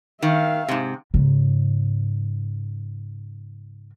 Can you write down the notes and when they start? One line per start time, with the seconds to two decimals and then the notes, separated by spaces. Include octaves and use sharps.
0.22 D#3 E5 F5
0.68 G#2 C3
1.14 G#2 C#3